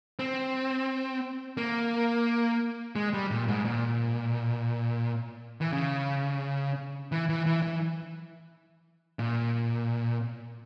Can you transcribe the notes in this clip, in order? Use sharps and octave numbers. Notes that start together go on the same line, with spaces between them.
C4
A#3
G#3
G3
A#2
G#2
A#2
E3
C#3
E3
E3
E3
E3
A#2